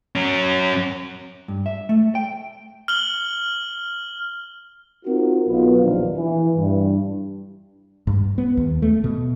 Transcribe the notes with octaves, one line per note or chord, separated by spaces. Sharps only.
F#3 C#4
G2
E5
A3
G5
F6 F#7 G7
C4 D#4 F4 F#4 A#4
B1 B3 F4
A#1 D#2 C3 D4 F5
E3
G2
G2
B3
D#2
A3
B2